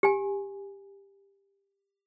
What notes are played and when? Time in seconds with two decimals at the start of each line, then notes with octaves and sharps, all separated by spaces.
0.03 G4 G#5